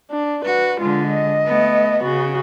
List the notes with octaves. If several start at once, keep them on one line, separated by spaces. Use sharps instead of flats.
D4
F#4 B4
D3 G#3 F4
D#5
A3 B3
C#3 F#4